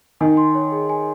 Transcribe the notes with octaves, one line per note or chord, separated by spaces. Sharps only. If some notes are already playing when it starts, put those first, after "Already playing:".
D#3 G#5
C6
C#5
G#4
G#5